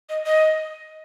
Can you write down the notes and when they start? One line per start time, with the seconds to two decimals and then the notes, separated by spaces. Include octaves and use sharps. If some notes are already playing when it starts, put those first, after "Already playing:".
0.09 D#5
0.26 D#5